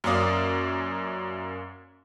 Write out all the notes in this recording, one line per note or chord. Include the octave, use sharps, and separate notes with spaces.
F#2 A#3 C#4 D5 F5 D#6